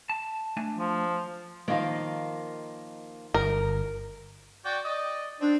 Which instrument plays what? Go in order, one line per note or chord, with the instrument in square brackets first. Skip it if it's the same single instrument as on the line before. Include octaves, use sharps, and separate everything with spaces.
[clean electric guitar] A5
A3 D4 G#5
[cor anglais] F3
[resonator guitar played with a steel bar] D#3 F3 [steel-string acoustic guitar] A#3 D#5 F5
[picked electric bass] G1 [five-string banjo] A#4
[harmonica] F#4 D5 G5
D5 D#5
[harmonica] C4 [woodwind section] D4